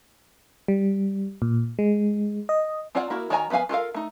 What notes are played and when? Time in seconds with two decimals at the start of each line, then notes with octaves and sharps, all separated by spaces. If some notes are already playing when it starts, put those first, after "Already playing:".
0.68 G3
1.42 A#2
1.79 G#3
2.49 D#5
2.95 C4 F4 C#5 D5 F#5
3.10 A#3 E4 F#4 A#4
3.30 D#3 F#4 C#5 G#5 A#5
3.50 F3 B3 B4 F5 G#5
3.69 F4 A4 A#4 F5
3.94 A3 D#4